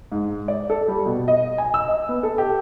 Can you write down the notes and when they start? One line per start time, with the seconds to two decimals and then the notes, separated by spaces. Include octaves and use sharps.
0.12 G#2
0.48 D5
0.70 A4
0.88 G3
1.06 B2
1.28 D#5
1.58 G#5
1.74 E6
1.88 D#5
2.09 B3
2.23 A4
2.38 G4